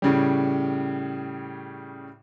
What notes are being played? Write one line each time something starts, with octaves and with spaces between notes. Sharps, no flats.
A2 C#3 G3